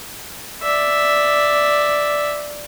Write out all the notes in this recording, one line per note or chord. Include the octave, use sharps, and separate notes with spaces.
D5 E5